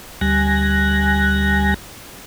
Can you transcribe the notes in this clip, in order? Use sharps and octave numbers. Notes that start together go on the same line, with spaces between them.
D2 G3 G#5 F#6 A#6